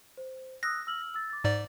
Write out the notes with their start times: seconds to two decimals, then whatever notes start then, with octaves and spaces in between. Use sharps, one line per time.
0.17 C5
0.63 D#6 E6 F#6 A#6
0.87 E6 F6 F#7
1.14 E6 A6
1.30 D6 A6
1.44 G#2 D5